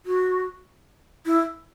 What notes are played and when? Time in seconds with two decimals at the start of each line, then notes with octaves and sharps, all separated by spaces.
0.06 F#4
1.26 E4